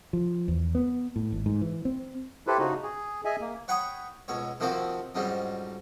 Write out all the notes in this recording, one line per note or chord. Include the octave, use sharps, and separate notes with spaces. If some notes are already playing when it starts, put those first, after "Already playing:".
F3
E2
B3
A2
G#1
G#2
E3
C4
E4 G4 A4 B4 C5
C#3 D#4 F#4
G#4
G#4 D#5 E5 G#5
A#3
C#5 F#5 G5 B5 C#6 D#6
C#2 B2 C#5
C3 D#3 F3 A#3 C4 F#4
F2 G#2 C#3 F#3 G3